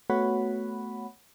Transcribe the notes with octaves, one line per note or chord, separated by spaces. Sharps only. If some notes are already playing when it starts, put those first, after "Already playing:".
A3 B3 F#4 C#5 F#5 B5